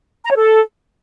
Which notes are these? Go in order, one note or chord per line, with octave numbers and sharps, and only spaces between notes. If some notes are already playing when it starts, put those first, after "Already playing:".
A#5
C#5
A4